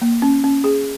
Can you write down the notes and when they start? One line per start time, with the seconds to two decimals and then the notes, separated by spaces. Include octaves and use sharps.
0.02 A#3
0.22 C#4
0.44 C#4
0.64 G#4